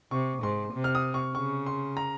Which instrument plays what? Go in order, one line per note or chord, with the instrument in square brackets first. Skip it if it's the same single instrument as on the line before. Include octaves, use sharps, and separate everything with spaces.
[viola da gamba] C3 [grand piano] C#6
[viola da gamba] G#2 [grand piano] C6
[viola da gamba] C3
[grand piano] F6
D#6
C#6
[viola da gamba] C#3 [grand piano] C#6
[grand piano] C6
A#5